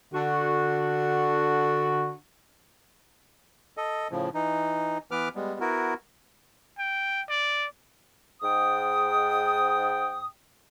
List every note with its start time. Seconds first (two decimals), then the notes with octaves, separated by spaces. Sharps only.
0.14 D3 F#4
3.77 A4 D#5
4.11 A2 C#3 F3
4.34 E3 D#4
5.11 E3 B3 B4 D6 F6
5.35 G3 G#3 B3
5.60 B3 E4 F#4 A#4
6.79 G5
7.29 D5
8.42 G#2 G5 D#6